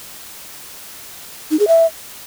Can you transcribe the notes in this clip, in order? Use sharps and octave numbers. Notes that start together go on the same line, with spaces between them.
D#4
G#4
E5